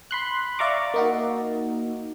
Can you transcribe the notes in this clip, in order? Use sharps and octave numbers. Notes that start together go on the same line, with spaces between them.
B5 C6 F#6
D5 E5 F5 A#5 C#6 D6
A#3 D#4 F#4